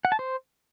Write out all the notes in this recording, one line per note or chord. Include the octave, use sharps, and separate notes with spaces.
F#5
A5
C5